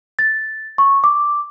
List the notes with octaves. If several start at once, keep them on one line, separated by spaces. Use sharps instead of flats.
A6
C#6
D6